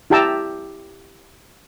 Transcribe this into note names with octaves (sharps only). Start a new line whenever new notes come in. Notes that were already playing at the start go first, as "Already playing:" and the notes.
E4 G4 G5 A5 A#5 E6